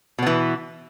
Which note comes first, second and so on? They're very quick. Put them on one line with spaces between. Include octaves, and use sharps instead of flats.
B2 B3 E3